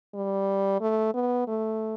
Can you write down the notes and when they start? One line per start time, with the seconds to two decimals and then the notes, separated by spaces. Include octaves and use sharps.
0.14 G3
0.81 A3
1.14 B3
1.47 A3